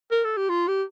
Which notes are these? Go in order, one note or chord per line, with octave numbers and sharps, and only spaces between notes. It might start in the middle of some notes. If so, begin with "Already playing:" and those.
A#4
A4
G4
F4
G4